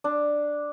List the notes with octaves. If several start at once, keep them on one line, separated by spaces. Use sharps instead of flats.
D4